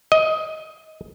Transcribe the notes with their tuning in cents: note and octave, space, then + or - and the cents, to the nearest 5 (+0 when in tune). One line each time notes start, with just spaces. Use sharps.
D#5 +15